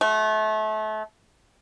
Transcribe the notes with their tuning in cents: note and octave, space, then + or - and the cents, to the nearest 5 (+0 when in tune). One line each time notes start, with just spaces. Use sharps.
A3 -30 F#4 +0